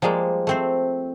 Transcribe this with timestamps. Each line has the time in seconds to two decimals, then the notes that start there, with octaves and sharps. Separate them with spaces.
0.02 F3 G3 G#3 A#3
0.47 A3 C4 C5